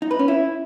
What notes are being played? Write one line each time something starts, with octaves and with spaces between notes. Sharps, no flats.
D#4
B4
C#4
E4